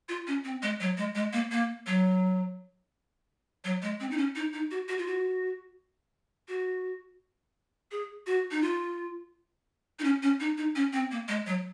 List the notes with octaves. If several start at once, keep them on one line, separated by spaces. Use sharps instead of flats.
F4
C#4
C4
G#3
F#3
G#3
G#3
A#3
A#3
F#3
F#3
G#3
C4
D#4
C#4
D#4
D#4
F#4
F#4
F4
F#4
F#4
G#4
F#4
D#4
F4
D#4
C#4
C#4
D#4
D#4
C#4
C4
A#3
G#3
F#3